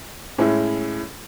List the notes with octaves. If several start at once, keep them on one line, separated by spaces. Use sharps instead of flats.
A2 G#3 C#4 E4